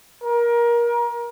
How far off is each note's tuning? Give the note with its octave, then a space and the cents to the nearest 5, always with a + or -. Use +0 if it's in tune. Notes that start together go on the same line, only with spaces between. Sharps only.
A#4 +25